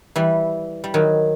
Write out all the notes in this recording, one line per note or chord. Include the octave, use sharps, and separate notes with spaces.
E3 G3
G3
D#3 F#3